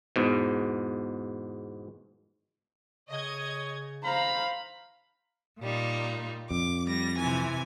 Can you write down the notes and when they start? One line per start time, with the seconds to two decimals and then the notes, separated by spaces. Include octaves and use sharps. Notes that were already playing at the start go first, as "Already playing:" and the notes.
0.16 E2 G#2 B2
3.09 C#3 C#5 D#5 G#6
4.04 C5 F5 A#5 B5
5.59 A#2 G3 D#4
6.51 F2 D6
6.87 G3 A#6
7.19 C3 E3 G#5